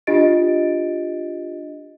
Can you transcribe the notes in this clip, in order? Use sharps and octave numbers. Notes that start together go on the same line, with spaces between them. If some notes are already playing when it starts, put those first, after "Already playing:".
D4 F4 G4 D#5 A6 D7